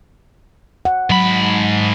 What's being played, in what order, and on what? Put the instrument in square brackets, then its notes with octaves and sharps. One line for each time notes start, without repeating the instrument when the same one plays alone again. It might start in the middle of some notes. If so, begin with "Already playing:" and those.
[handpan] F#5
[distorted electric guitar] G#2 B5 [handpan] F#3